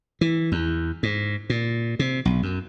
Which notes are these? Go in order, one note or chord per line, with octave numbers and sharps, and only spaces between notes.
E3
E2
G#2
A#2
C3
B1
F#2